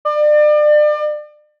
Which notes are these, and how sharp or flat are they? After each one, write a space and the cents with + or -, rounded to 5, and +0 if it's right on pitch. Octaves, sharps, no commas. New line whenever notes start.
D5 +35